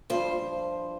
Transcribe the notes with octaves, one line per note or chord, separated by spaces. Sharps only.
G2 F3 C5